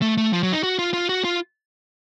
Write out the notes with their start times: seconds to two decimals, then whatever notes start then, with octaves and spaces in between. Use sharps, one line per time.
0.02 A3
0.17 A3
0.33 F3
0.43 F#3
0.52 D#4
0.63 F#4
0.79 F4
0.94 F4
1.09 F#4
1.24 F4